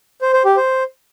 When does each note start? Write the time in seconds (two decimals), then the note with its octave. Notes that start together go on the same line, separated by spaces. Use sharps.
0.22 C5
0.33 C5
0.45 G4
0.57 C5